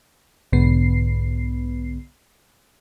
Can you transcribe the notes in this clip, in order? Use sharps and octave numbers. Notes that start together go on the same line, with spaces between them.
B1 G#2 D3 B3 C7